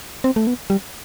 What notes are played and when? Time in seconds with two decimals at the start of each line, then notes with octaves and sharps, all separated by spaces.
0.24 C4
0.36 A3
0.47 B3
0.70 G3